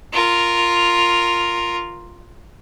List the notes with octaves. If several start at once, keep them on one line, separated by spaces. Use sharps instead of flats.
F4 A#4